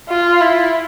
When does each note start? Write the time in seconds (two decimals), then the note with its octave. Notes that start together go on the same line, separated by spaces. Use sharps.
0.09 F4
0.40 E4